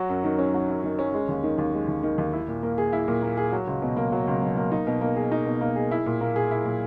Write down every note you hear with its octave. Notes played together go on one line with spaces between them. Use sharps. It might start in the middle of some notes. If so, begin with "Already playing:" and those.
Already playing: F#3 F#4
F#2
D#3
C#4
F#3
F#2
D#3
C#4
G#3
D#2
D#3
D#2
G#3
D#2
D#3
D#2
E4
A#2
A#3
G#4
E4
A#2
A#3
G#4
F#3
C#2
B2
A#3
F#3
C#2
B2
A#3
D#4
B2
A#3
G#4
D#4
B2
A#3
G#4
E4
A#2
A#3
G#4
E4
A#2